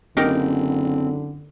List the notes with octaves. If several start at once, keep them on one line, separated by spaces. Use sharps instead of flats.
F#1 D3 C4 D#4 G4 A#4